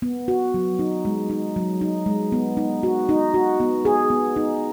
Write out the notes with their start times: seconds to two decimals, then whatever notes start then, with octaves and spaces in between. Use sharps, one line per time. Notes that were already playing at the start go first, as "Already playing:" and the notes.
0.02 B3
0.28 F#4
0.54 F#3
0.79 D#4
1.05 G#3
1.30 D#4
1.56 F#3
1.81 D#4
2.06 G#3
2.32 B3
2.57 D#4
2.83 F#4
3.09 D#4
3.34 F#4
3.60 B3
3.85 G#4
4.10 B3
4.36 D#4